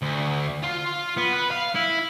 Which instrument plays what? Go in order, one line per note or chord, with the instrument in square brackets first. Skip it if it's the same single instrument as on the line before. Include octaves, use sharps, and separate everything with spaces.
[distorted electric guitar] D2
F4
B3
B4
F5
E4